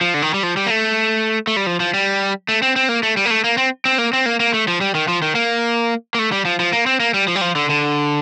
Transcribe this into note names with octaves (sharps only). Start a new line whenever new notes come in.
F3
D3
D#3
G3
F3
G3
A#3
A3
A3
G3
F3
F3
G3
A3
C4
C4
A#3
A3
G3
A#3
A3
A#3
C4
C4
A#3
C4
A#3
A#3
A3
F3
G3
D#3
F3
D#3
A#3
A#3
A3
G3
F3
F3
A#3
C4
A#3
G3
F3
G3
F3
D3
D3